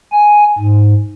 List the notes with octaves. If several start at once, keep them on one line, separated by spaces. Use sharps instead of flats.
G#5
G#2